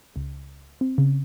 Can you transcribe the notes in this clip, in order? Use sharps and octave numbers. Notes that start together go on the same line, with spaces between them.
C#2
C4
C#3